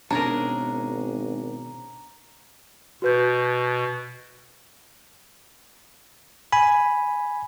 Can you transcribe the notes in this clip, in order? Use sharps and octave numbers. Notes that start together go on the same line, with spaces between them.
G#1 B2 C#4 D4 G#4 A#4 A#5
B2 F#4 B4 G6
G#5 B5